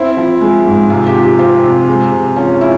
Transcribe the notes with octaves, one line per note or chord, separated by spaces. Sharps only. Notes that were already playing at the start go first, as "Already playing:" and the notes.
Already playing: C4 E4
F3
G#3
G#2
C3 F4
G4
F3
G4
C4 F4
C3
G#3
C3
F3 C#4
E4